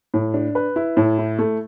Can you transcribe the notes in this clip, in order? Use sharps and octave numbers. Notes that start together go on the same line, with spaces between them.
A2
D4
B4
E4
A2
E4
A3